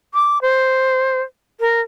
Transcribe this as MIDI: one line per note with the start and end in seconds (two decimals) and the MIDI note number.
0.14 0.41 86
0.42 1.22 72
1.60 1.81 70